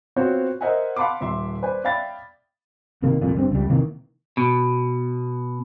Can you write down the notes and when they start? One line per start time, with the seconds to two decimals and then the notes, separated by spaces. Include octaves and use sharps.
0.16 B3 C4 F4 F#4 C5 C#5
0.61 A#4 C5 D#5 E5 F#5 G#5
0.96 F5 F#5 A5 B5 C6 D6
1.21 D#1 E5 C6
1.63 B4 C5 D5 G#5
1.84 D5 E5 F5 G5 B5 A6
3.02 F#1 C3 D#3 A#3
3.22 C2 F2 A#2
3.35 G1 G2 C4
3.52 C#2 G3
3.69 C3 D#3 E3 A#3
4.37 B2